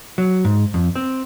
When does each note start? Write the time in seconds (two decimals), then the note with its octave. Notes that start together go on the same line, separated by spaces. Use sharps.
0.18 F#3
0.45 G#2
0.74 F2
0.96 C4